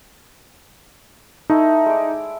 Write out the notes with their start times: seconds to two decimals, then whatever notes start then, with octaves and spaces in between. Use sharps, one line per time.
1.50 A3 D#4 E4
1.86 G#3 D5